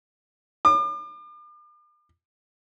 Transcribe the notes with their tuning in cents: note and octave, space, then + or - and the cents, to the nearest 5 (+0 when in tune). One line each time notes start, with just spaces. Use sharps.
D6 +40